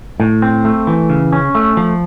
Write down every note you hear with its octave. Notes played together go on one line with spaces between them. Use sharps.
A2
C4
A3
E3
C#3
C#4
A3
F3